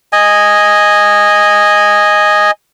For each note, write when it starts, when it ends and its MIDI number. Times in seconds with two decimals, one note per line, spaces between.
0.13 2.51 75
0.13 2.51 80